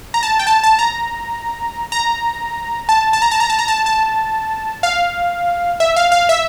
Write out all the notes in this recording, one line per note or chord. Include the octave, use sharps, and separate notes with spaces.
A#5
A5
G5
A5
A5
A#5
A#5
A5
A5
A#5
A5
A#5
A5
A#5
A5
A5
F5
E5
F5
F5
E5